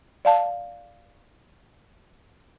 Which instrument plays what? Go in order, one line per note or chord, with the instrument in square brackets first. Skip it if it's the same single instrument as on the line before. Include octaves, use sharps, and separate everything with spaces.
[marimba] D5 F5 A5